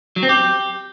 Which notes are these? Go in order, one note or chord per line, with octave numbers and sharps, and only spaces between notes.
F#3
C4
G4